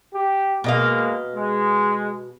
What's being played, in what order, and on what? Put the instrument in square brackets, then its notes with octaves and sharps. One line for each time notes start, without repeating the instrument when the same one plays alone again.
[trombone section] G4
[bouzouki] B2 D#5 F5 [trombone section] G#3 A#3
[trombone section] G#3